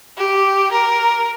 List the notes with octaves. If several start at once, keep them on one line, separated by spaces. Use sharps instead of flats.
G4
A#4